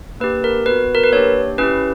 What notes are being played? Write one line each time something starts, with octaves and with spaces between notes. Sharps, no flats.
A#3 D4 G4 B4
A#4
B3 F#4 B4
A#4
B4
A#3 D4 G4 C#5
C#4 E4 G4 B4